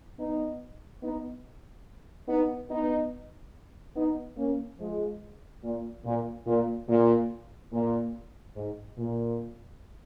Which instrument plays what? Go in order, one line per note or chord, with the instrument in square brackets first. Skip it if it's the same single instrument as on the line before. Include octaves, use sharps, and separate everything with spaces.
[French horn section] B3 D#4
B3 D#4
B3 D#4
B3 D#4
B3 D#4
A#3 C#4
F3 G#3
A#2
A#2
A#2
A#2
A#2
G#2
A#2